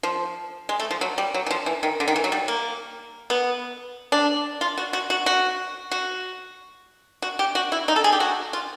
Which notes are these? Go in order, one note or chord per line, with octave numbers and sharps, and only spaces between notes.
F3
G#3
A3
F3
F#3
G3
F#3
E3
F3
E3
D#3
D3
D#3
E3
F#3
G3
A#3
B3
D4
F4
F#4
F#4
F#4
F#4
F#4
F#4
G4
F#4
E4
D#4
A4
G#4
G4
F#4
F4